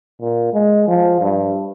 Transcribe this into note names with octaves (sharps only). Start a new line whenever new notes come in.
A#2
G#3
F3
G2